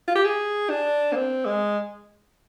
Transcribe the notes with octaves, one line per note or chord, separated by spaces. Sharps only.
F4
G4
G#4
D4
A#3
C4
G#3